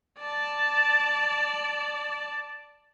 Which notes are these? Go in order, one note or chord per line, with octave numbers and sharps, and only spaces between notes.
D5 A5